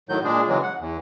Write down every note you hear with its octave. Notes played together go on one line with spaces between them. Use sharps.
A2 D#3 F#3 G6
A#2 G#3 D4 G#4
C#3 E3 F#3 G#3
F#5
E2